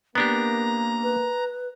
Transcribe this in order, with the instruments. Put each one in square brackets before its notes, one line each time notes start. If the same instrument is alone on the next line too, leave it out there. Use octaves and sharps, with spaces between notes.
[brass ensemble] A#3 [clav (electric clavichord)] B3 D4 G4 [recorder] A#5
[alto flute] B4